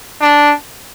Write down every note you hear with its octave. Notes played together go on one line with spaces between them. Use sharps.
D4